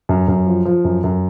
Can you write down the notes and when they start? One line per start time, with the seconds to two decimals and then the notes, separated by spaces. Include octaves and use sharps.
0.09 F#2
0.28 F#2
0.47 F3
0.65 F3
0.84 F#2
1.04 F#2